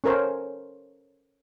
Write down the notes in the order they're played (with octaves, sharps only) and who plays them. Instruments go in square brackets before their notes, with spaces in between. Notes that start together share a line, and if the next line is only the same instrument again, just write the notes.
[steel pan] C#4 A4 A#4 C5 C#5